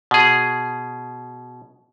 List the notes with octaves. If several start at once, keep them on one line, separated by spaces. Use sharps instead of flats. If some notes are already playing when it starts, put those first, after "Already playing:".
B2 G#4